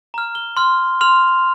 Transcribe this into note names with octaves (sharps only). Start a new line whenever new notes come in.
A#5 F6
G7
C6 F6
C6 F6 F7